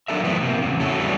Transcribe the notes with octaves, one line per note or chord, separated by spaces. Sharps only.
F#3 D4 A4 A#4 E5
B2 E3 F3 A3 B3 C4
C3 A#3
E2 C#3
E4 F#4 A4 C#5
E2 E3 F#3 G3 A3